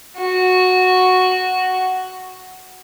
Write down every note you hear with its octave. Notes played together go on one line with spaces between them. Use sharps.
F#4 C#6